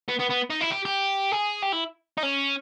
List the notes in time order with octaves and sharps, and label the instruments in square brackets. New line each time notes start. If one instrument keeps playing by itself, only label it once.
[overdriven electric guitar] B3
B3
B3
D#4
E4
G4
G4
G#4
G4
E4
D#4
C#4